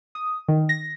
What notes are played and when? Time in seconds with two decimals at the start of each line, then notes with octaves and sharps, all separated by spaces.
0.15 D#6
0.48 D#3
0.69 A#6